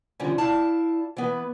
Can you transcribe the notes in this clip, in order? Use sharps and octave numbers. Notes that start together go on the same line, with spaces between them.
D3 E3 F3 G3 C#4
E4 D5 F5 A5
E3 B3 B4